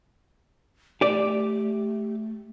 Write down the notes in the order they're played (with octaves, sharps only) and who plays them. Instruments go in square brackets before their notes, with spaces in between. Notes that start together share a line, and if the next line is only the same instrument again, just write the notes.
[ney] A3 [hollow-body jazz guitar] G4 D5